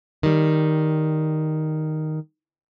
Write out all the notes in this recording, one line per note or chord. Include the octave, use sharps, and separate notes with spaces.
D#3 G3